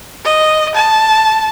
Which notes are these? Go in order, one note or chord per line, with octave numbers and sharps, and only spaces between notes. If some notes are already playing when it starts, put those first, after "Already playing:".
D#5
A5